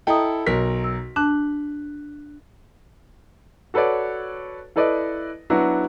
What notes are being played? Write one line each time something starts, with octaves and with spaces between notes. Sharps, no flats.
E4 A4 D#5 G5 A#5 D#6
B1 F#4 A#4 B6
E6
D4 A5 F#6
F#4 A4 B4 C#5 D5
E4 A4 B4 D5 D#5
F#3 B3 D4 E4 F#4